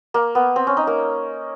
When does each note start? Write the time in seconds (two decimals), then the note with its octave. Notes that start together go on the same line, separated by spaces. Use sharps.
0.14 A#3
0.35 B3
0.56 C4
0.67 C#4
0.77 D#4
0.87 A#3